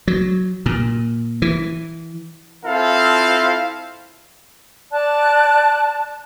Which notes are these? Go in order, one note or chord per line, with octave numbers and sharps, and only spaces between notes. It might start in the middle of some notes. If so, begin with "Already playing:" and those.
F#3
A#2
E3
C4 E4 F4 A4 F5
D5 A5 F#6